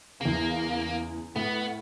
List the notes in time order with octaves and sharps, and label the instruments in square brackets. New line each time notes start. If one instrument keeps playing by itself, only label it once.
[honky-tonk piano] E2 C#3 [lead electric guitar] A#3
[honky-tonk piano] A2 [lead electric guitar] B3